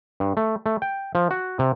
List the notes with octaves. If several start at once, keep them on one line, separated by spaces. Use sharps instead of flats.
G2
A3
A3
G5
F3
F#4
C3